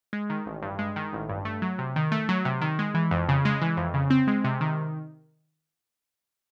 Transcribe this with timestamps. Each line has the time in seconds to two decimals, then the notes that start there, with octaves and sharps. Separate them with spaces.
0.13 G#3
0.30 D#3
0.46 A1
0.62 G2
0.79 G#3
0.96 D#3
1.13 A1
1.29 G2
1.45 A3
1.62 F#3
1.78 C3
1.96 D#3
2.12 A3
2.29 F#3
2.45 C3
2.61 D#3
2.79 G#3
2.94 E3
3.11 F2
3.29 C#3
3.45 G#3
3.62 E3
3.77 F2
3.94 C#3
4.10 C4
4.27 G#3
4.44 C3
4.61 D#3